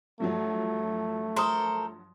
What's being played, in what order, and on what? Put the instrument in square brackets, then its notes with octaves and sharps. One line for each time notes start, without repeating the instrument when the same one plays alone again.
[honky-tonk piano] G2 F3 F#3 [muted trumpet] A3
[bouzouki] A4 A#4 C5 [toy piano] C6 D#6